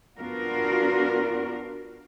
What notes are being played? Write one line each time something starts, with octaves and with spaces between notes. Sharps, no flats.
B3 D4 F4 F#4 A#4